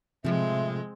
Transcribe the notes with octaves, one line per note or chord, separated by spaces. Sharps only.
A2 C3 F3 G#3 C4 E5